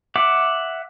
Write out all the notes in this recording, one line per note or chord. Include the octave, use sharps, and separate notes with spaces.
E5 F#5 D6